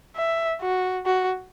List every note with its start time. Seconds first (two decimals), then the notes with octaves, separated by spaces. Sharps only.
0.17 E5
0.61 F#4
1.06 F#4